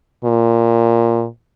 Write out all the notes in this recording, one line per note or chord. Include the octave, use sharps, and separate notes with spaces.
A#2